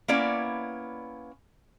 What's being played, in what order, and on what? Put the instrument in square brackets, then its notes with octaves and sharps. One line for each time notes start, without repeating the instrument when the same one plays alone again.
[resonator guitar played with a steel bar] A#3 B3 C#4 E4 D5